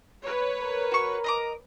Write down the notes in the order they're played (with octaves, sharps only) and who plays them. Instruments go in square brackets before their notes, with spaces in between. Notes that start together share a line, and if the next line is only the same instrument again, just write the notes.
[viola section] B4 C#5
[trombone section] A#4
[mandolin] F#4 C#6
D#5 A#5 D6